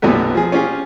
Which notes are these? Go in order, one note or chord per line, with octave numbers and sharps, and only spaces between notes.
B1 F#2 A#2 G3 A3 B3
F3 G#4
C#4 F4 G4 G#4